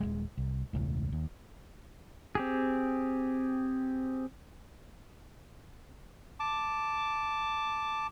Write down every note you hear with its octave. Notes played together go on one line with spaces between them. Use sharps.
D#1 G#1 G#3
C2
E1 C#2 A2
D#2
C4 G4 G#4
A5 D6